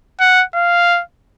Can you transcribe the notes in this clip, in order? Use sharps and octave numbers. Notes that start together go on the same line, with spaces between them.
F#5
F5